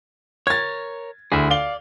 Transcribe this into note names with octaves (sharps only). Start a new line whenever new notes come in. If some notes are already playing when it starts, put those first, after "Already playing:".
A#4 C#5 G#6 A6
D2 E4 G#4
D5 F5 G7